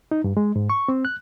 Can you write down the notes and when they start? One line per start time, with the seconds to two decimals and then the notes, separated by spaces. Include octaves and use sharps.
0.11 D#4
0.24 G2
0.37 G#3
0.56 G#2
0.70 C#6
0.88 C4
1.05 F#6